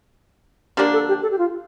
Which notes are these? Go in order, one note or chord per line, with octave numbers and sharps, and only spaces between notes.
D3 F3 A#3 D4 G4
A4
G4
A4
G4
F4